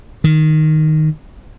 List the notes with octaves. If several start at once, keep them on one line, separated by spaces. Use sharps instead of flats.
D#3